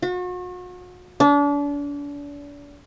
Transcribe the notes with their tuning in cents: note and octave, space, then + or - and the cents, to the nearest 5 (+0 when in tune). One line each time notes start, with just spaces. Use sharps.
F#4 -40
D4 -35